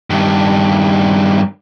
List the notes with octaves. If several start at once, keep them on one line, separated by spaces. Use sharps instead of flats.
G2 D#3